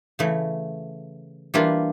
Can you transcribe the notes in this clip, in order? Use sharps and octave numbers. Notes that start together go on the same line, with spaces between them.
C#3 E3 A3
E3 G3 A#3 D4 F4